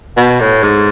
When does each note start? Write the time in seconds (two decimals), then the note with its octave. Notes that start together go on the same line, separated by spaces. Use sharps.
0.17 B2
0.41 A2
0.63 G#2